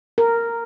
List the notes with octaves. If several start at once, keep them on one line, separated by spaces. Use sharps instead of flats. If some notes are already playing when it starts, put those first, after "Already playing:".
A#4